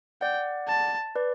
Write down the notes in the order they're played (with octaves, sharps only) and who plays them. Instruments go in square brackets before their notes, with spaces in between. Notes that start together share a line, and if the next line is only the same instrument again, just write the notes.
[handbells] D5 F#5 [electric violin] G5
[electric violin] A5
[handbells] B4 D5